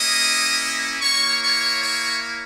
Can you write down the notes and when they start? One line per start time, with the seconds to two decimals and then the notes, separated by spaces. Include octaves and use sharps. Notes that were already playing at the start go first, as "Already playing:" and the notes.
Already playing: A#3 C#4 E4 D#5 D#6
1.01 A#3 E4 C#5 C#6
1.42 C#5 C#6
1.83 C#5 C#6